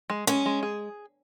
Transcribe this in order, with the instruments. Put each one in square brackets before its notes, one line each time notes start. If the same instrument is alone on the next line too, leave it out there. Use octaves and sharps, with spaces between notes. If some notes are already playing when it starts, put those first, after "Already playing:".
[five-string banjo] G#3
[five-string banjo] G#3 [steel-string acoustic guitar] C#4
[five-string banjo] G#3
G#4